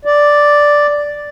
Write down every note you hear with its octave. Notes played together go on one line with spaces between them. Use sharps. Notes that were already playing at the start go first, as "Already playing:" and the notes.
D5